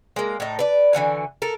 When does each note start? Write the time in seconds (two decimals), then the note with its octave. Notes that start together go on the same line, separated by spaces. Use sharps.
0.16 G#3 A#3
0.40 A2 D#4
0.59 B4 D5
0.93 D3 E3 F#4 G#5
1.42 A4 A#4